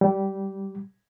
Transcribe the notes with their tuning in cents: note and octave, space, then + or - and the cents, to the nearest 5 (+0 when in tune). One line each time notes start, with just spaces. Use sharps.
G3 -15